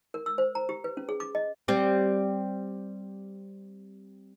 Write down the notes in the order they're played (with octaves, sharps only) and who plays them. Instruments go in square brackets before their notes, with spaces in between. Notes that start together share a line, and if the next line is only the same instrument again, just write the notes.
[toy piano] A#4
E6
C5
A#5
G4
B4
C#4
G#4
D6
D#5
[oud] G3 C4